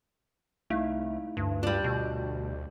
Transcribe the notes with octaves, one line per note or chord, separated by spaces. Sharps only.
C2 A3 D#4 E4 F5
D2 G2
G3 D4 F4
B2